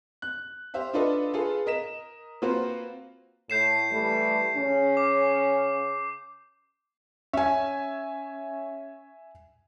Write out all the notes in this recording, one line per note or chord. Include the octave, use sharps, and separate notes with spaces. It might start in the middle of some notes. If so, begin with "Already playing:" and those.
F#6
G4 C5 E5 F5
D4 F4 A4 B4 D#5
F4 G#4 A4 B4 F5
A#4 D#5 B6 E7
A#3 C4 F4 F#4 B4 C5
A2 G6 C7 E7
E3 G3 A3
C#3 C#4
D6
C#4 E5 G#5